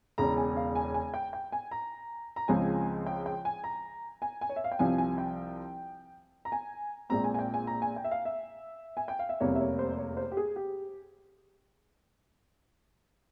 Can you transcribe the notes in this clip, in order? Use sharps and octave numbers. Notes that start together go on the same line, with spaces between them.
E1 E2 C#3 A#5
G#5
F5
G#5
G#5
G5
G5
G#5
A#5
A#5
C#2 C#3 F3 G#3 C4 G#5
G5
G5
G#5
A#5
G#5
G#5
C#5
E5
F5
G5
C2 C3 F3 C4 G#5
G#5
G5
A#5
G#5
A#1 A#2 G#3 C4 A#5
G#5
G#5
G5
G#5
A#5
G#5
G5
E5
F5
E5
G#5
G5
F5
E5
F1 E2 C3 G3 A#3 C#5
E5
C#5
C5
C#5
C5
G4
G#4
G4